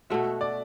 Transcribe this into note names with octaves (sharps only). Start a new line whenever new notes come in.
B2 A3 F#4 E5
D5